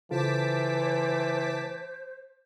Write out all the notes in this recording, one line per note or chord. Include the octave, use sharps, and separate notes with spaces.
C#3 E3 F4 A4 C5 A5 D6 B6